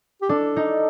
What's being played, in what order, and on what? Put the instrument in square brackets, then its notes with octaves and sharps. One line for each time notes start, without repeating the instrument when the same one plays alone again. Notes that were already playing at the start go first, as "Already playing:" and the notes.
[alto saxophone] G4
[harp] D4 [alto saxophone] A4
[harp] D#4